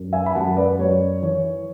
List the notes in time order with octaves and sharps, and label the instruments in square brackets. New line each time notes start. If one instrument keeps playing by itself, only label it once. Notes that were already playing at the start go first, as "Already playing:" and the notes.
Already playing: [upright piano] F#2
E5 G#5
B5
F#2 F#5 A5
B4 D5
F#2 C#5
E3 C#5